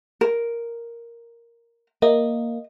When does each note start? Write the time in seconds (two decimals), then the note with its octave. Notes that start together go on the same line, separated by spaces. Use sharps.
0.21 A#4
2.02 A#3 D#5